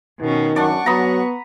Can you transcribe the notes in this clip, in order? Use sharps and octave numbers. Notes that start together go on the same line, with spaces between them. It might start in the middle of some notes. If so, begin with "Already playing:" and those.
B2 D#3 C#4
F#2 D4 D5 F#5 C#6
F#3 B3 A#5 B5 D#6